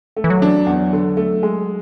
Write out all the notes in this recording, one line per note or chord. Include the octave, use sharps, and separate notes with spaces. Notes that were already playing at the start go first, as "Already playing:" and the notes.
A3
E3
F#3
D4
E2
D3
A3
G#3